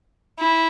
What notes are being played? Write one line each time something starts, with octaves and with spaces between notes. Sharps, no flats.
E4